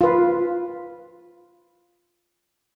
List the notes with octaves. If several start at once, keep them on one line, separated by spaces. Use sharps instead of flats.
F4 B4